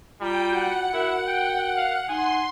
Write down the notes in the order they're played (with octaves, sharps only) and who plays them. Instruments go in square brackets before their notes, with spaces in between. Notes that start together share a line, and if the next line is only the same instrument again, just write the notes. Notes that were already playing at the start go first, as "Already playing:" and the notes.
[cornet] G3 [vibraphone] F4 A#5 [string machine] G5
[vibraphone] F#4 [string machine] F#5
[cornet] E4 [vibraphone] F#4 A#4
[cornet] G5
F5
[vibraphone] D#4 F#5 [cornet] G#5 [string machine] C6